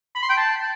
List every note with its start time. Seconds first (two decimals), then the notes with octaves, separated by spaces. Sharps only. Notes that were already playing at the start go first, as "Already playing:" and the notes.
0.15 B5
0.22 C6
0.30 G5
0.37 A5